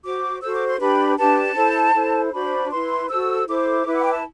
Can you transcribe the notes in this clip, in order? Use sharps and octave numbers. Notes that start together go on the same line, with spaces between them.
F#4 C5 D6
F#4 A4 C5 E6
D6
C6
D4 G4 B4 B5
D4 G4 B4 A5
E4 A4 C5
E4 A4 C5
D4 F#4 C5 B5
E4 B4 C6
F#4 A4 C5 E6
E4 A4 C5 D6
E4 B4
F#5
G5
A5